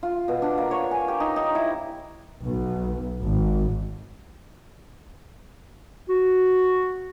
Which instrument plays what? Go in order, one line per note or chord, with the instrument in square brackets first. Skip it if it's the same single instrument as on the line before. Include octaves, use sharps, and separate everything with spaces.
[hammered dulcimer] F4
B2
D4
A#3
C#5
G#5
G4
D#4
D#4
E4
[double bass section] B1
G#1
[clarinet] F#4